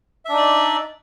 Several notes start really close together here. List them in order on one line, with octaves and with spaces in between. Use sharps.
E5 D4 D#4 D5